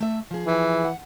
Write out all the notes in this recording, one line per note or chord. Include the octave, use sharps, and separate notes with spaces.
A3 E5
F3 G#4
E3
F#5